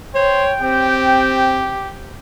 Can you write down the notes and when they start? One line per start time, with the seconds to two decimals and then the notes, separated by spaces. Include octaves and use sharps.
0.15 C5 C#5 G5
0.61 C4 G4